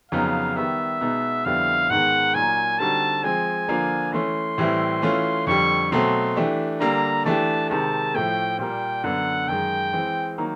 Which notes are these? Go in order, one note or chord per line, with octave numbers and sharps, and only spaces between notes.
F2 C#3 F#3 B3 D#4 F5
D#3 G3 B3 E5
B2 G#3 B3 D#4
F2 D3 G3 B3 E4 F5
G#2 D#3 G#3 B3 F#5
A#2 F#3 A#3 D#4 G#5
D3 G3 C4 D#4 F#4 A5
F3 G#3 C4 G#5
D3 F3 A#3 D4 F4
E3 A3 C#4 C6
A2 E3 G3 C4 E4
E3 A3 C#4 F4
F2 D3 G3 C#6
B2 F#3 A3 C4 C6
E3 A3 D4 G4
D3 G3 A#3 A#5
E3 A3 D4 G4 A5
C3 D#3 G#3 A5
A2 F3 A3 G5
A#2 G3 A#3 G5
F#2 D3 F#3 B3 F#5
F#2 D#3 G#3 G5
E3 G#3 C4
D#3 F#3 A#3 D#4